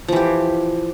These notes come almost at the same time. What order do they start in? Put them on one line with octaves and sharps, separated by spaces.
F3 E3 G4